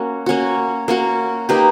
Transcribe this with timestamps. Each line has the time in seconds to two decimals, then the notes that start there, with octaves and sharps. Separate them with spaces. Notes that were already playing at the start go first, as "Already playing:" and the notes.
Already playing: A#3 C#4 F#4
0.26 A#3 C#4 F#4
0.88 A#3 C#4 F#4
1.49 A#3 D#4 G4 B4